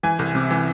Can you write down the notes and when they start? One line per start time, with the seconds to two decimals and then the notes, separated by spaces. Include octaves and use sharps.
0.03 E3 G#5
0.19 C2
0.35 C3
0.51 E3